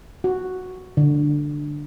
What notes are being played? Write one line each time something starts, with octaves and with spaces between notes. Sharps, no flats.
F#4
D3